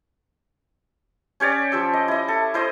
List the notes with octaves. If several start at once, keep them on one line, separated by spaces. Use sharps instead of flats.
C#4 G4 C#5 D5
F3 G4 E6
D#5
E4 D#5
A4
E4 C5 D#5 D#6